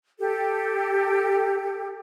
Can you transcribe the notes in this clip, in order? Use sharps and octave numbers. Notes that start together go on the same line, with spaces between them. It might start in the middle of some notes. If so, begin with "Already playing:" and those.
G4 A4